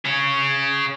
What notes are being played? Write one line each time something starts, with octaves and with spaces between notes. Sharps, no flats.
G#4 C#5